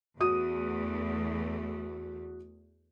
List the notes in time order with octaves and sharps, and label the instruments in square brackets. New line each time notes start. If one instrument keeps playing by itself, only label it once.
[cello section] E2 A3 [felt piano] F#4 D#6 D#7